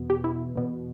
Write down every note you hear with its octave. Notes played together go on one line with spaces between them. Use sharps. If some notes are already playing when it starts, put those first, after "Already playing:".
Already playing: E2 B2
G4
E4
E2 B2